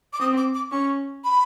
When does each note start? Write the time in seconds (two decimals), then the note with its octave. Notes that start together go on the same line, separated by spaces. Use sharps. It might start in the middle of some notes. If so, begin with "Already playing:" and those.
0.13 D6
0.20 C4 D#6
0.37 D6
0.55 D6
0.71 C#4 C#6
1.24 B5